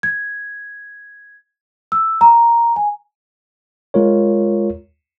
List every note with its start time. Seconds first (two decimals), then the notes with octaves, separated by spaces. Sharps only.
0.03 G#6
1.92 E6
2.21 A#5
2.76 G#5
3.94 G#3 F4 A#4 C#5